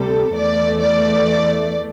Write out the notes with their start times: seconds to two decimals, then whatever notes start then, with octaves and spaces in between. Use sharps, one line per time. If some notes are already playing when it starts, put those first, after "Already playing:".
Already playing: D2 C3 G3 A4
0.35 E2 E3 A3 D5
0.79 D5